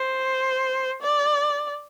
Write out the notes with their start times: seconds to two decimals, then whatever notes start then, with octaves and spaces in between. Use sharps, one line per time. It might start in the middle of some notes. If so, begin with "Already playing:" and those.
Already playing: C5
1.02 D5